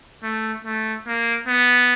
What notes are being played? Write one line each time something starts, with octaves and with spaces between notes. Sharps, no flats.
A3
A3
A#3
B3